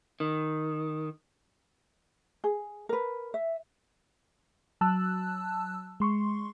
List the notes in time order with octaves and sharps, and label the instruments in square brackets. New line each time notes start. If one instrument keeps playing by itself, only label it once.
[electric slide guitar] D#3
[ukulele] G#4
A#4 B4
E5
[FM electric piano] F#3 A5 E6 F#6
G#3 C6 C#6